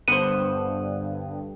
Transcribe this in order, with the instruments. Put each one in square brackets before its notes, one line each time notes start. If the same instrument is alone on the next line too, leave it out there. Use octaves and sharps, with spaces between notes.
[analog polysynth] G2 D3 [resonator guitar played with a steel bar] B3 C5 [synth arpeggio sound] D#7